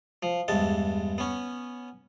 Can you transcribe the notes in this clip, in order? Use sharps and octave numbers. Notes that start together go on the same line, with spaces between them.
F3
E2 G2 G#3 A5
B3 C#4